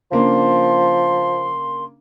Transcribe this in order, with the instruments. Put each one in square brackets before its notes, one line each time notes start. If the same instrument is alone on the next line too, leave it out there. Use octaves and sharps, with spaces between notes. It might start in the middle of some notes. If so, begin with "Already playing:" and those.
[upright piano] C#3 A#3 D4 [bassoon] F3 [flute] C6